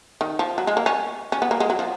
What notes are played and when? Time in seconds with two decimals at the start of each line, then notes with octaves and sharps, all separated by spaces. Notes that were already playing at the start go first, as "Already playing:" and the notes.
0.21 D#3
0.39 F3
0.58 F#3
0.67 G#3
0.77 A#3
0.86 C#4
1.32 C#4
1.42 B3
1.51 A#3
1.60 G#3
1.70 F#3
1.79 F3